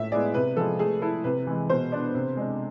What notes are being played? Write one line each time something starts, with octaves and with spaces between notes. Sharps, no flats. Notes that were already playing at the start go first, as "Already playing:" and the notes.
Already playing: A2 E5
G#3 B3 E4 G#4 D5
C3 B4
F3 G#3 C4 G#4 A4
A3 G#4
E4 A4 B4
C3 B4
E3 G#3
B2 C5
B3 D4
C3
G#3 D4